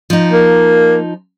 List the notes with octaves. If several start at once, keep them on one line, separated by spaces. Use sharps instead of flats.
F3 D#4
A#3